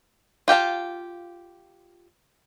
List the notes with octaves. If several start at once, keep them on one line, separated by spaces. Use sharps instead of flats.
F4 G4 F5 A5